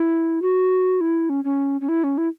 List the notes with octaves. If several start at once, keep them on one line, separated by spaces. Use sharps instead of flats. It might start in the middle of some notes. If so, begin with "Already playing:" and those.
Already playing: E4
F#4
E4
C#4
C#4
C#4
E4
C#4
E4